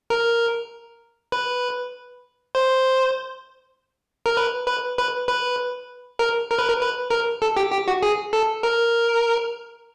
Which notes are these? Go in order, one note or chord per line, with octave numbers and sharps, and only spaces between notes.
A#4
B4
C5
A#4
B4
B4
B4
B4
A#4
A#4
B4
A#4
B4
A#4
A4
G4
G4
F#4
G#4
A4
A#4